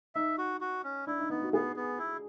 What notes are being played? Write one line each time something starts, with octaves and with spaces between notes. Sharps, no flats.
D#4 E5
F#4
F#4
C#4
D4 E4
D#4
B3 D#4
F#4
B3 G#4
B3
E4